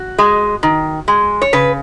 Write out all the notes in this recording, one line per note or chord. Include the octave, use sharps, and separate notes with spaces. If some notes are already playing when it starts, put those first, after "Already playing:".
Already playing: F#4
G#3
D#3
G#3
C#5
C#3 B4